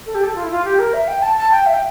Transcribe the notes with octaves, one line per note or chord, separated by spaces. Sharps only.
A4
G4
A4
F4
E4
F4
G4
A#4
E5
G5
A5
A5
G5
E5
G5